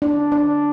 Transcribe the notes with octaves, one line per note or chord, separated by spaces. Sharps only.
D4
D4